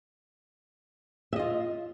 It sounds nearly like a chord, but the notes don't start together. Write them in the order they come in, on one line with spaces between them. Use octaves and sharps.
E5 D#5 F4